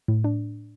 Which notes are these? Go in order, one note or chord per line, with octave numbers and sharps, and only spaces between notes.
A2
D4